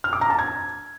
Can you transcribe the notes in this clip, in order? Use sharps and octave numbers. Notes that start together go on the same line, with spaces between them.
F6
D6
A#5
A5
G#6